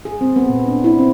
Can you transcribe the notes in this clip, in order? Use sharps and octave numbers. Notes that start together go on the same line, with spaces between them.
G#4
C4
B3
A#2
D4
E4
C4